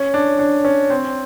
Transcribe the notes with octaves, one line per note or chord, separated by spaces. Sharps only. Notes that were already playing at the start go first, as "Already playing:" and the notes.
Already playing: C#4
D4
D4
C#4
C4